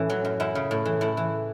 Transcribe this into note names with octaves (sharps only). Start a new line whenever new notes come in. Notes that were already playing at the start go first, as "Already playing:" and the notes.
Already playing: A2 E3 C#4 E4
F#3
F#2
F#2 E4
C#3
A2
E3
A2 E4
E3